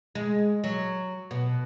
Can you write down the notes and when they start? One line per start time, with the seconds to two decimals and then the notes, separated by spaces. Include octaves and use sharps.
0.15 G#3
0.64 F#3
1.31 B2